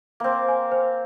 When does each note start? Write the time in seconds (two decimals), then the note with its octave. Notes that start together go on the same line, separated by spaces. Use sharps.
0.20 A#3 C4 C5
0.49 G#5
0.72 C5